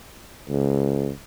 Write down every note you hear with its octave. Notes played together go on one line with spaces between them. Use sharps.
C#2